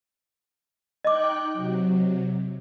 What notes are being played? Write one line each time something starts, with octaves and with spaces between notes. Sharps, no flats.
D#4 D#5 G5 D6 F#6
C3 F#3